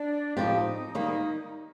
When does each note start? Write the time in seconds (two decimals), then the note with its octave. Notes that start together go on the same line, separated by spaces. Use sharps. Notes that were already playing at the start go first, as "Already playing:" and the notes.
Already playing: D4
0.37 A2 F3 C4 D#4 G4
0.95 D#3 G3 A#3